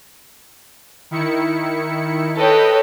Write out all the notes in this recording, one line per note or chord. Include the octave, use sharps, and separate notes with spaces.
D#3 E4 C#7
A4 B4 C#5 D#5 G5